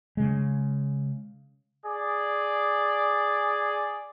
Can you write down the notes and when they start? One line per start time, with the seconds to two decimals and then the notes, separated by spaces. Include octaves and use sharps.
0.17 C#3 G#3
1.84 G#4 D5